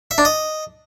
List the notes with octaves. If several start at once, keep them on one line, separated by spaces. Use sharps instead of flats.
E5
D4
D#5